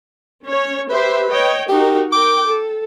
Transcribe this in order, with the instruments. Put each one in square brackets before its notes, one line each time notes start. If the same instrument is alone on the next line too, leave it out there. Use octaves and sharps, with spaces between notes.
[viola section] C#4 C#5
[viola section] G4 C5 E5 [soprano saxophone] B4
[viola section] C#5 D#5 G5
[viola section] D#4 F#4 A#4 [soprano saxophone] G4
[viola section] A#4 G5 [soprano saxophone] D6
[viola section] A4